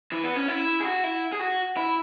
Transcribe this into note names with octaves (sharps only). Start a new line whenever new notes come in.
E3
B3
C#4
E4
G#4
F#4
E4
G#4
F#4
E4